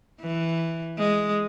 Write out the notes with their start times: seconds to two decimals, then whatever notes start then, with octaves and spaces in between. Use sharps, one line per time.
0.21 E3
0.98 G#3